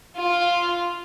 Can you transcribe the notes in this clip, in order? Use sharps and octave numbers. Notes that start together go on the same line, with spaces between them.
F4